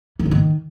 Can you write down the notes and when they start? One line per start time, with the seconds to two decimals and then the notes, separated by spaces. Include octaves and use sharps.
0.19 E3
0.25 E2
0.31 D#3